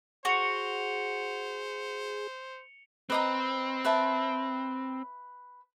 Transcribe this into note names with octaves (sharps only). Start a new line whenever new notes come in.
F#4 G#4 C5 C#7 F7 G7
C4 B4 D#5 A#5
B4 E5 A5